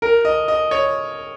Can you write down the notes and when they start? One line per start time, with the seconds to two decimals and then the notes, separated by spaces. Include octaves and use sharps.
0.02 A#4
0.25 D#5
0.48 D#5
0.71 C#5